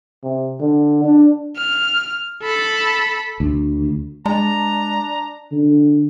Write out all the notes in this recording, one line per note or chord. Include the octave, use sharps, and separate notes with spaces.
C3
D3
D4
F6
A4 B5
D2
G#3 D4 A5 A#5
D3